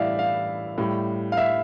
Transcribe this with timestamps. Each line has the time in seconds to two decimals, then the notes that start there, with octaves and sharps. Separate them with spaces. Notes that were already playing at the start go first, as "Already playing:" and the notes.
Already playing: A2 E3 G3 D5 E5 F5
0.19 F5
0.78 A2 G3
1.32 F5
1.37 E5